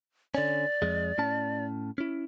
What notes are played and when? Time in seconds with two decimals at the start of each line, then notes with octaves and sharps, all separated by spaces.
0.35 D3 C#4 D5
0.82 F2 G#3
1.18 A2 C#4 A5
1.98 C#4 E4